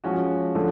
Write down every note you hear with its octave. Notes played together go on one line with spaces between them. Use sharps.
F3 G#3 C#4 F#4
D3 F3 A3